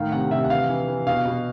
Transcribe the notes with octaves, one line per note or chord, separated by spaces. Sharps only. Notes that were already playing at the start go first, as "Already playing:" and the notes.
Already playing: A2 D#3 F5
C3 F#5
C3 E5
F#5
E3 F5
E3
E3
B2 F5
B2